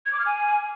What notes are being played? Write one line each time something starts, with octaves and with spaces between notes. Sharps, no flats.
G#6
D6
F6
G#5